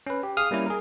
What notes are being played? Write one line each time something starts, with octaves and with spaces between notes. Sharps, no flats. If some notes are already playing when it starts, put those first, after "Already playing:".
C#4 B4
G4
G#4 F5 D#6 F6
G3 A#3 C#4 E4
G#4 A#4